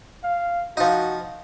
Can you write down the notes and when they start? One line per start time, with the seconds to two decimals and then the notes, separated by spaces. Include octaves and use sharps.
0.23 F5
0.77 F3 D#4 F#4